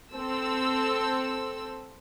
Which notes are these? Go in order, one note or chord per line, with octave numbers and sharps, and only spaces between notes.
C4 A4 E6